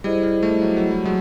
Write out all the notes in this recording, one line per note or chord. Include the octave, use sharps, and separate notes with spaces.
G3 E4 G#4 C5 D#5
G3
G3 A3
F#3
F#3
G3
F#3 G#3